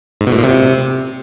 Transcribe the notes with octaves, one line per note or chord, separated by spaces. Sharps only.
G#2
B2
A2
A#2
C3